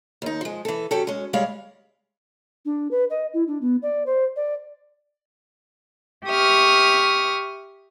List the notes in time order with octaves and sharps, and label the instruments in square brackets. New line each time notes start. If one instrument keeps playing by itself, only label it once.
[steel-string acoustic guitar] D#2 D#4
F3 G#3
E3 A4
F#3 C#4 G4 A4
G#3 C#4
D2 G3 G#3 C#5 F5
[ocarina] D4
B4
D#5
E4
D4
B3
D5
C5
D5
[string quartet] G4 E5 C#6 D#6 F6